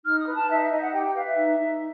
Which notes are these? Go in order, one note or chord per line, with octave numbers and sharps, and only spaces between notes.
D#4 F6
D#6
B4
A5
D#4 E5
E5
D#4 D#5
F#5
G4 G5
G5
B4 F5
E5
D#4
D#4